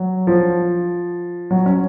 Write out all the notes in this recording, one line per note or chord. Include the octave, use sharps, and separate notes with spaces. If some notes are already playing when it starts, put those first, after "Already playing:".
Already playing: F#3
F3
F#3
C#4